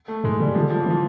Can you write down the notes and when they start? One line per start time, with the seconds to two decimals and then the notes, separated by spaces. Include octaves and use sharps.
0.08 A3
0.24 G#2 G#3
0.40 C#3 G3
0.55 D3 F3
0.70 F3
0.80 E3
0.86 D#3
0.90 F3